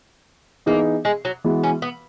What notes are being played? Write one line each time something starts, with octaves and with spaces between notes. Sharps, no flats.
E3 A#3 B3 D#4 G#4 D#5
G#3
F#3
E3 G#3 B3 F#4
C#4
B3